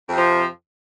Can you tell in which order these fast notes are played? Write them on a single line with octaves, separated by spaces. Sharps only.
F2 C3 F3